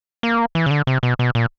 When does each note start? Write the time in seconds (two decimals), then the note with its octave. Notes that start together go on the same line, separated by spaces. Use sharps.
0.23 A#3
0.55 E3
0.66 C#3
0.71 D3
0.87 C3
1.03 B2
1.19 B2
1.35 A#2